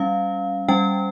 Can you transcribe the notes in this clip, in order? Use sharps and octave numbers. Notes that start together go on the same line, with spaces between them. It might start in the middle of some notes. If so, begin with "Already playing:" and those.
Already playing: G3 C#4 F5
G3 C#4 G5